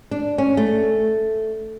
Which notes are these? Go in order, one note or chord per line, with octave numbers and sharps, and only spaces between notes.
D4
C#4
A3